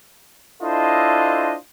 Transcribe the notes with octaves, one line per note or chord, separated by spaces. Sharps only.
D4 E4 F4 A4 C5 D#5